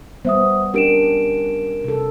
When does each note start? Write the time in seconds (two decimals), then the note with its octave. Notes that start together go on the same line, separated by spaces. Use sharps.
0.25 G3 B3 C5 E5 D#6
0.74 C#4 D4 G4 A#4 D7 E7
1.84 C3 A4